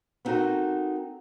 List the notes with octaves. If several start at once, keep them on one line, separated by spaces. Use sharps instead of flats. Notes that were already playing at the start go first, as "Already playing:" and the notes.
B3 C4 D#4 F#4 A4 A#4